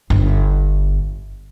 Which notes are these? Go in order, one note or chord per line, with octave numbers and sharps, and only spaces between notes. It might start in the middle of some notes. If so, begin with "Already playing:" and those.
G1